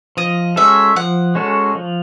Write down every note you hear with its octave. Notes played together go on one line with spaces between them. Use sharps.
F3 D#5
G#3 C#4 F#4 A4 E5
F3 F#5
G#3 C#4 F#4 A4
F3